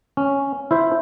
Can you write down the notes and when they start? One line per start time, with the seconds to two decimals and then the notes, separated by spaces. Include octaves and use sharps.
0.17 C#4
0.71 E4 C5 E5